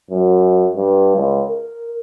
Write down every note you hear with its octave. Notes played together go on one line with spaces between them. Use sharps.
F#2
G2
C#2
A#4